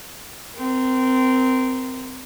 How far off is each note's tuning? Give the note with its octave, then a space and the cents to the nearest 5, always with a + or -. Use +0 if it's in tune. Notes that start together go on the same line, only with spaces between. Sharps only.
C4 -20 A#4 +0